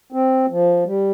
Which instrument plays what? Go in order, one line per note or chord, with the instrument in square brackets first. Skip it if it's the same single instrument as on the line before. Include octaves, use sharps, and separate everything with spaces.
[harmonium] C4
F3
G3